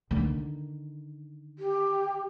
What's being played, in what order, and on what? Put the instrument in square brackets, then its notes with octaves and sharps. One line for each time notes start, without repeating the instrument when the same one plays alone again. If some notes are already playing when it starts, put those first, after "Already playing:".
[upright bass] D3 D#3
[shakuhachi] G4